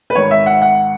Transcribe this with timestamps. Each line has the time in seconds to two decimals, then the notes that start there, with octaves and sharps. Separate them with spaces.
0.10 B4
0.15 G#1 G#2 D#3 C#5
0.31 E5
0.46 F#5
0.62 F#5